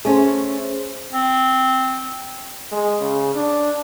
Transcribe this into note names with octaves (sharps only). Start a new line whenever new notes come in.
A3 C#4 G#4 C5
C4
G#3
C#3
D4